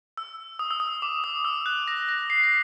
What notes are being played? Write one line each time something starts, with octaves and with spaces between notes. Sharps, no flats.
E6
D#6
E6
D#6
D6
D#6
E6
F#6
A#6
A#6
C7
A#6